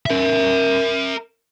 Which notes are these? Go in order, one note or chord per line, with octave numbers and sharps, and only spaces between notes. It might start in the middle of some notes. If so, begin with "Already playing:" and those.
A#4 E5